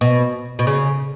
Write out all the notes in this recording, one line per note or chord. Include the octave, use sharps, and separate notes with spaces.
B2
B2
C#3